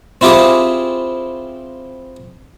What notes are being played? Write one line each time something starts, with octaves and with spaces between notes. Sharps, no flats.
C4 E4 F4 G4 G#4